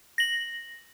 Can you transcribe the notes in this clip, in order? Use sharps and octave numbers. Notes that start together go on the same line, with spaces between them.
A#6 F#7